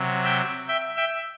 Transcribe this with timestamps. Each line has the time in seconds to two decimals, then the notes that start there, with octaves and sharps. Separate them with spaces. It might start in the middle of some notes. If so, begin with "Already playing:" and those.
Already playing: C3 F#3
0.24 E5 G5
0.68 E5 G5
0.96 E5 G5